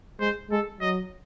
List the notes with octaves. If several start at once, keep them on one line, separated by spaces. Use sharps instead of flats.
G#3 C5
G#3 A4
F#3 D#5